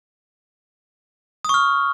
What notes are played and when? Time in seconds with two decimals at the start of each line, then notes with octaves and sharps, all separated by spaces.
1.45 D#6
1.49 C#6
1.54 F6